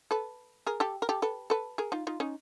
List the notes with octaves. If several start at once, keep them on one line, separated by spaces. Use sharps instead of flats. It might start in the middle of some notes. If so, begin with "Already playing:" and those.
A4 B4
G#4 A#4
G4 A4
A#4
G4 A4
A4 B4
A4 B4
G#4 A#4
D#4 F4
D#4 F4
C#4 D#4